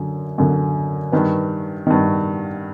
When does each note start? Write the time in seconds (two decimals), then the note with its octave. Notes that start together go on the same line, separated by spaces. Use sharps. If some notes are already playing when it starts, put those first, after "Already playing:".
Already playing: F#2 D3
0.38 F#2 D3
1.12 G2 D#3 B4
1.87 G2 D#3